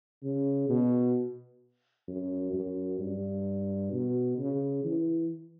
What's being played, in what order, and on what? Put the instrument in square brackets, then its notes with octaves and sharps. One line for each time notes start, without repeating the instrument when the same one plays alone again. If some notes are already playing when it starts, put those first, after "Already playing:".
[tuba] C#3
B2
F#2
F#2
G2
B2
C#3
E3